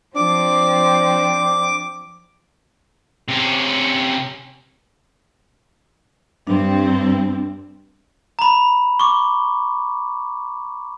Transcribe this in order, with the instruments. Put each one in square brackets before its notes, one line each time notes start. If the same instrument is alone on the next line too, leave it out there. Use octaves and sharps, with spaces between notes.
[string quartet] F3 C4 C5 [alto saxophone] D4 [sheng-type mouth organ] D6
[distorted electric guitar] C3 C#4
[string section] G2 C4 [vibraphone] D4
[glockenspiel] A#5 B5
C#6 D6